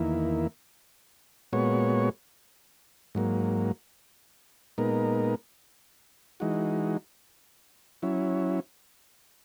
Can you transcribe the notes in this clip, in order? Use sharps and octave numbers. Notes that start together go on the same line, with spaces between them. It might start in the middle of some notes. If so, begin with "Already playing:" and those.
Already playing: E2 D#3 A#3 E4
A#2 G#3 B3 F#4 C#5
G#2 F#3 A#3
A#2 G#3 B3 D#4 A#4
E3 G#3 D#4 F#4
F#3 C#4 E4